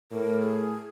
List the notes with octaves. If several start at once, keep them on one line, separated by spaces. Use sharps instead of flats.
A2 A#4
G#4